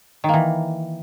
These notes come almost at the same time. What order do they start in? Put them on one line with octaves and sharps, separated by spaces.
D#3 A#3 E3